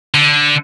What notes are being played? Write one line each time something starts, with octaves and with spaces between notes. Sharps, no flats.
D3